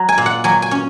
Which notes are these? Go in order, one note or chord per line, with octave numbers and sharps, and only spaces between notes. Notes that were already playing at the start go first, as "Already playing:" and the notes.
Already playing: F#3 A#5
G#5
A#2
F#5
F#3 G#5
G#5
C#4